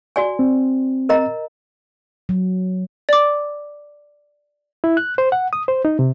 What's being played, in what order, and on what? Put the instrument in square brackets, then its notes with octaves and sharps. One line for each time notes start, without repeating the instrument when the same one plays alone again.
[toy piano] F#4 D5 G#5
[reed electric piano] C4
[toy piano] A#4 D#5 A#5
[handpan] F#3
[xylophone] D5 D6
[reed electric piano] E4
F#6
C5
F#5
D#6
C5
D#4
C3